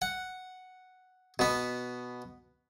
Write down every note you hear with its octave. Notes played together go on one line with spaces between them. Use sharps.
F#5
B2 B3